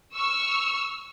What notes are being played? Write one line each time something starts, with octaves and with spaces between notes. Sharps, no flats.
C#6 E6 F6